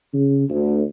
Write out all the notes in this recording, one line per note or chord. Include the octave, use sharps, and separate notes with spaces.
C#3
D2